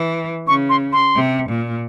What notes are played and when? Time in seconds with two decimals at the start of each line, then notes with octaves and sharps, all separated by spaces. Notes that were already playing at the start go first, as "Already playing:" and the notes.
Already playing: E3
0.47 C#3 C#6
0.69 C6
0.93 C6
1.14 C3
1.48 A#2